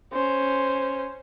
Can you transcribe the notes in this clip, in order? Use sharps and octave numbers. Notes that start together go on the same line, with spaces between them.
C#4 C5